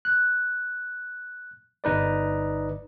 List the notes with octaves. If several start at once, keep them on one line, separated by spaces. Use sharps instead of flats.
F#6
G1 D#4 B4 D5